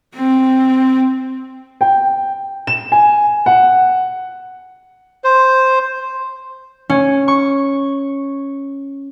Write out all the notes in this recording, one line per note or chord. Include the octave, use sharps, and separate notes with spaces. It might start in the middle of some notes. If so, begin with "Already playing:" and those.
C4
G5
E7
G#5
F#5
C5
C#4
C#6